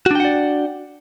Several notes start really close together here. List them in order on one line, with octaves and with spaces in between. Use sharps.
F#4 D4 G5 F#5 D5